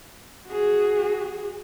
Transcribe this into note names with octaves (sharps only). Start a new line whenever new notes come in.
F#4 G#4